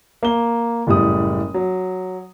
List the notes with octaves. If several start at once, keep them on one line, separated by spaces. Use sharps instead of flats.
A#3 G7
F#1 A2 G3 D#6
F#3